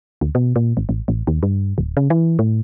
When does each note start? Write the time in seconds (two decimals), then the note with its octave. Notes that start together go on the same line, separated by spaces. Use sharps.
0.21 D2
0.35 B2
0.56 A#2
0.77 G#1
0.89 A1
1.08 A1
1.27 D#2
1.43 G2
1.78 D1
1.97 C#3
2.10 E3
2.39 A2